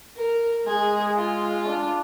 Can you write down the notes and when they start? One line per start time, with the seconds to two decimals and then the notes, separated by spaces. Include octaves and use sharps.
0.16 A#4
0.66 G#3 G#4
1.16 F4
1.67 D4